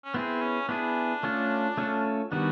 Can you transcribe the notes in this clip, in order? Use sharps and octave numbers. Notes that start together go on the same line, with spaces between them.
C#4
B3 C4 E4 G#4
C#4
B3 D4 E4 G#4
A3 C#4 F4 A4
A3 C#4 F4 A4
D#3 G3 B3 D4 F#4